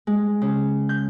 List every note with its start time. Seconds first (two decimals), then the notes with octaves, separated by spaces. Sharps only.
0.07 G#3
0.42 C#3
0.89 G6